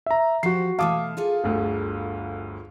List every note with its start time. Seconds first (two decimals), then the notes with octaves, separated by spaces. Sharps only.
0.06 E5 A#5
0.43 F3 F#4 G4 C5 C7
0.79 B2 E3 A3 F5 A5 D6 D#6
1.17 F4 G#4 A4
1.44 G1 D2